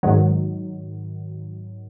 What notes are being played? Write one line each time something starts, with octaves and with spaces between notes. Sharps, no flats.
G#2 D#3 F#3